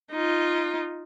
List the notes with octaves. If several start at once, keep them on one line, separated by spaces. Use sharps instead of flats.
D#4 F4